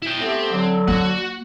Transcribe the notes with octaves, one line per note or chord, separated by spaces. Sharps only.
E4 G5
A3 B3 C4 G4
D3 F#3
A#3 F#4 F#5